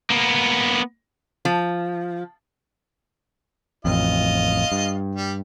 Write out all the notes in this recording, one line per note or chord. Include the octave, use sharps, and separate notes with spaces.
A#3 B3
F3
A1 F2 F4 D#5
G2
G3